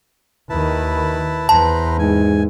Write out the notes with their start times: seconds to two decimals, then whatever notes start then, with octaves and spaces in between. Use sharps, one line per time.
0.50 D#2 D#3 E4 B4 A5
1.49 E2 B4 C5 A5 A#5
1.99 G#2 G#5